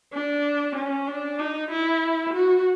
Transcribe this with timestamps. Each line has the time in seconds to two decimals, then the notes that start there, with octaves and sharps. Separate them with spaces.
0.13 D4
0.75 C#4
1.07 D4
1.39 D#4
1.70 E4
2.34 F#4